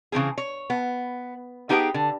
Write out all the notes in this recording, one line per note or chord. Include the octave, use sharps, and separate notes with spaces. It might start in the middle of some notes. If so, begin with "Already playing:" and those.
C#3 E3 C4 G#4
C#5
B3
B3 D#4 G4 G#4 B4 G5
D3